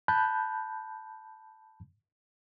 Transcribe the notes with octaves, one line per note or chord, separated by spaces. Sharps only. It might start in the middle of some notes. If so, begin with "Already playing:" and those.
A5 B5 F#6 G6